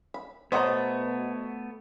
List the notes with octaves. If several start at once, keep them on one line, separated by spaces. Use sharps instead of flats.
B5
B2 A3 B3 C5 C#5 D#5 F#5 A#5